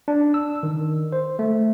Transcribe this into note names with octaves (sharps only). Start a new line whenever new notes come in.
D4
E6
D#3
C5
A3